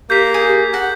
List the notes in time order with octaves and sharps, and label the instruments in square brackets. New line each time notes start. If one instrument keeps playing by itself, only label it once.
[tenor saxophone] A#3 [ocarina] G4 [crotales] G6 B6
[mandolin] G#4
[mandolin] F#4 [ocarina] F#5